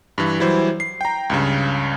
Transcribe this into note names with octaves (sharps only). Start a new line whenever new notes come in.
G2 E3
E3 F#3 G3 E4 C5
C7
G5 A#5
C#2 G2 C#3